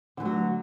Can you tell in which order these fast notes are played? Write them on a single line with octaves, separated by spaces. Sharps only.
D3 E3 A3 F#3